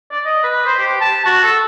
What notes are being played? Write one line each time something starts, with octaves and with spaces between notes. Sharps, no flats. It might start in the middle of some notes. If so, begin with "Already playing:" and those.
D5
D#5
B4
C5
G4
A5
F#4
A4